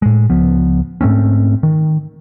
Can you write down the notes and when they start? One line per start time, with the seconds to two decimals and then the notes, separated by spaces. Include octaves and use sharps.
0.02 A2 G#3
0.30 C#2 F3 B3
1.01 G#2 A3 C4 C#4
1.63 D#3